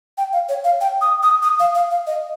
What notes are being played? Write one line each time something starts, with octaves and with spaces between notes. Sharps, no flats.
G5
F5
C#5
F5
G5
D#6
D#6
D#6
F5
F5
F5
D#5